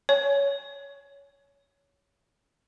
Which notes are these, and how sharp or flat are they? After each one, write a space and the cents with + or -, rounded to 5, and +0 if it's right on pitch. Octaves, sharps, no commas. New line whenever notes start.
C#5 +15